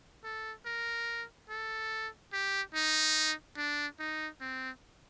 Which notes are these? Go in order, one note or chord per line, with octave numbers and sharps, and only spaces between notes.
A4
A#4
A4
G4
D#4
D4
D#4
C4